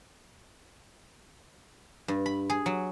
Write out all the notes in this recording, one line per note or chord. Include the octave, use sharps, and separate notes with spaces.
G2
B5
G#4
F#3